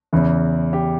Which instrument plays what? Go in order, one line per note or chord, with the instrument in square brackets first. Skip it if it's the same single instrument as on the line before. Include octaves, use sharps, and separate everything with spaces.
[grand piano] E2 C#3 E3
G4